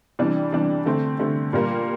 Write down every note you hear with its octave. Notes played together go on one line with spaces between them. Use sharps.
C3 E3 G3 D4
C3 E3 G3 D4
D3 A3 C4
D3 A3 C4
A#2 G3 A#3